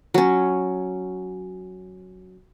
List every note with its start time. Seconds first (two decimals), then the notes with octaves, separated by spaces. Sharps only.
0.14 F#3 C#4